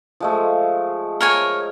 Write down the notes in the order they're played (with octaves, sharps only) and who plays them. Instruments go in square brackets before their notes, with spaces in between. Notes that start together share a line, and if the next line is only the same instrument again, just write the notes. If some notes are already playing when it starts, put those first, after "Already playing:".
[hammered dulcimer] F3 G#3 A3
[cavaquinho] A#4 C#5 G#5